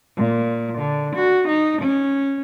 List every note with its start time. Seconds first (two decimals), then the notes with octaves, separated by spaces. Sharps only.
0.15 A#2
0.78 D3
1.15 F#4
1.46 D#4
1.79 C#4